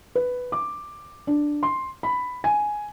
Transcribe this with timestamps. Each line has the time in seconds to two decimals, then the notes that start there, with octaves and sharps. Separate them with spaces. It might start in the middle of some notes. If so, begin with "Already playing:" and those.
0.15 B4
0.52 D6
1.27 D4
1.63 C6
2.03 B5
2.44 G#5